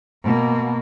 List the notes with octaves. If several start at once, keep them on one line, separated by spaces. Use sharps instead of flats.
B2 A#3